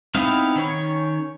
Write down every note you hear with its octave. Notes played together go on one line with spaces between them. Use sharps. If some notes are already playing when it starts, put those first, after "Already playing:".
B3 C4 D#4 E4 F5
D#3 C#4 C#5